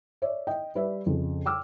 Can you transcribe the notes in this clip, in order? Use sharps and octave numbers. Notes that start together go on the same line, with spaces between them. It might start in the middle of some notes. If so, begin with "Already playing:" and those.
C#5 D5 E5
D#5 G5
G3 B4 D5 E5
F2 C#3
G5 D6 E6 F6